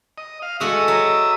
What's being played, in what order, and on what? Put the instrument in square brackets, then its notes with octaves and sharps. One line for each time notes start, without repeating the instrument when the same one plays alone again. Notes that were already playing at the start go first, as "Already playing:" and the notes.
[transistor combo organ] D#5
F5
[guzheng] G#3 F#4 A4 [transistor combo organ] E5 D#6
[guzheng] F#3